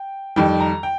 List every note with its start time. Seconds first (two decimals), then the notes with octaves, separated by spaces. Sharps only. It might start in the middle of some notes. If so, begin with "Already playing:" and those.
Already playing: G5
0.36 F2 D#3 G3 G5
0.60 A#5
0.83 G5